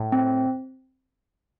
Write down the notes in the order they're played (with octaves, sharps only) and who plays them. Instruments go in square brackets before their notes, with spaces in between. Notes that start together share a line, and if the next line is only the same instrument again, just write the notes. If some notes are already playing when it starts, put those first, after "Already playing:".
Already playing: [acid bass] A2
[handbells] C4